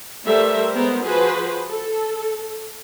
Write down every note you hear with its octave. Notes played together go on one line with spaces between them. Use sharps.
G3 A3 A4 A#4 C5 E5
G#3 B3 A#4 C5
F3 F#4 G#4 B4 C5
A4